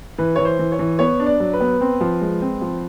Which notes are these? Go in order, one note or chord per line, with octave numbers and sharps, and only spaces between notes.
E3 B4
E3 C#5
C5
E3
C#5
E3
B3 C#5
D4
D5
F#3
B4
B3
C4
F3
G#3
C4
F3